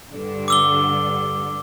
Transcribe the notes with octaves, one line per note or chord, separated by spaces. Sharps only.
G2 D3
D6 E6 G7